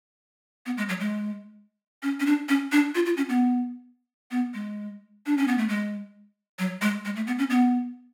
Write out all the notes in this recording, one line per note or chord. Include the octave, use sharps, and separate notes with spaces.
B3
G#3
F#3
G#3
C#4
C#4
D4
C#4
D4
F4
F4
C#4
B3
B3
G#3
D4
C#4
B3
A3
G#3
F#3
G#3
G#3
A3
B3
C#4
B3